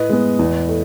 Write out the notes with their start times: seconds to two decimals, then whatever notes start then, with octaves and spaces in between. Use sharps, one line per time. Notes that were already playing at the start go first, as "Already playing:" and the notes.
Already playing: A2 B4 D#5
0.09 G#3 B3
0.39 E2
0.69 A3